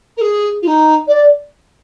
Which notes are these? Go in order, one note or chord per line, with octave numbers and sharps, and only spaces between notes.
A#4
G#4
F4
D#4
D5